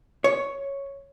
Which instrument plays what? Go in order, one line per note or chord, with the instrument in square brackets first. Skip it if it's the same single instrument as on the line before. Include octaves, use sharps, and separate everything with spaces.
[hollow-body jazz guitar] C#5